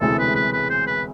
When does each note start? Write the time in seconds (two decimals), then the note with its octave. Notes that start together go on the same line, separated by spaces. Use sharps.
0.01 E1 D2 C3 E3 G#3 A4
0.18 B4
0.35 B4
0.53 B4
0.70 C5
0.87 B4